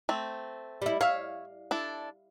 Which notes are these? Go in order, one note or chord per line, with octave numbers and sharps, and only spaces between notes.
A3 C4
G3 E4
C#5 E5 F5
D4 E4 A4